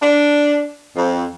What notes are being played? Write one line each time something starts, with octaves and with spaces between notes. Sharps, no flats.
D4
F2